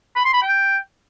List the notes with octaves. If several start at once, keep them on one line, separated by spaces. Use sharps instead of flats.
B5
C6
B5
G5